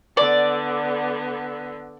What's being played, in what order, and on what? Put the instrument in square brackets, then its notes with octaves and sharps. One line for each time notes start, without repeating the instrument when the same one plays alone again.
[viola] D3 B3 [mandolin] D5